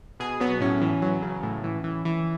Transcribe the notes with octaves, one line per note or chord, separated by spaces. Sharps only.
B2 G#4
F#3 B3
A2 C#4
E3
F#3
C#3
A2
E3
E3
E3